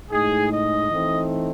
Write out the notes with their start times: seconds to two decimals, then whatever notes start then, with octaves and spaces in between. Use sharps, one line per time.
0.11 A2 G#3 D#4 G#4
0.52 D#5
0.90 E3 A3 C4 D#4